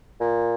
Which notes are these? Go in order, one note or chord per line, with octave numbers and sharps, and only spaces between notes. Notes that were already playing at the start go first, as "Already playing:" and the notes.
A#2